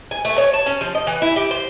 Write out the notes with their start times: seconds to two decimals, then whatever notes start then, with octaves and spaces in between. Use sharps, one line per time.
0.11 G#5
0.25 A3
0.38 C#5
0.54 A5
0.66 C#4
0.81 F3
0.95 D#5
1.07 E3
1.22 E4
1.36 G4
1.51 C5